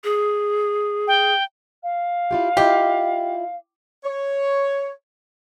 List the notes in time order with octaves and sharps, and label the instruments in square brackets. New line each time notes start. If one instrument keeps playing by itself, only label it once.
[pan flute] G#4
[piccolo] G5
F5
[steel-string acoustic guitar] E4 F4 G4
[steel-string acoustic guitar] E4 F4 D#5 [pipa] G4
[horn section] C#5